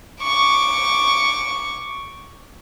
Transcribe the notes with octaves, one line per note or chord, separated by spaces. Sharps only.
C#6 D6